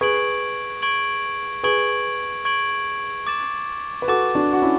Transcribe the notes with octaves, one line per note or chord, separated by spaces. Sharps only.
G#4 B4 C#6 G#6 D7 F#7
C#6 G#6 D7 F#7
G#4 B4 C#6 G#6 D7 F#7
C#6 G#6 D7 F#7
D6 A6 E7
B4
F#4 A4 D6 A6 E7
D4 F#4
F#4
C#4 E4